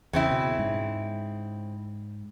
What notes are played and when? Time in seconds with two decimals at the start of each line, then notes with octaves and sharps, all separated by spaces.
0.13 E2 C#3 C4 E4
0.31 B2
0.59 G#2